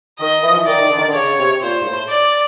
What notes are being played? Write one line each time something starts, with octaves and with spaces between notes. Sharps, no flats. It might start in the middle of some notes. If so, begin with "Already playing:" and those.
D#3 D#5
E3
F3
E3
D#3 D5
D#3
D3
D#3
D3
C#3 C#5
C3
A#2 C5
G#2
A2
D5